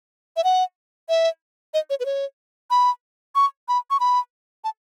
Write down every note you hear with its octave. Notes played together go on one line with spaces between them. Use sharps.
E5
F#5
E5
D#5
C#5
B4
C#5
B5
C#6
B5
C#6
B5
A5